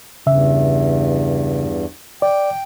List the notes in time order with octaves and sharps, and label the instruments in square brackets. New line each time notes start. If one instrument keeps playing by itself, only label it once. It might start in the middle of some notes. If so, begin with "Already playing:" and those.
[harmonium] E2 G2 [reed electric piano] C#3 E5
[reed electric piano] D5 [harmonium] G5